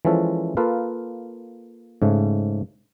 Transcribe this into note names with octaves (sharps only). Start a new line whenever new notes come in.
E3 F3 G#3 C#4 A4 B4
A#3 F4 A4 B4 F5
G#2 C#3 A3